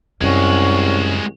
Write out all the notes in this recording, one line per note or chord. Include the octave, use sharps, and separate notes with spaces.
C2 F#2 G#3 C#4 F#4